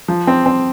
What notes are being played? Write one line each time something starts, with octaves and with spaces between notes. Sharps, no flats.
F3
C4
C4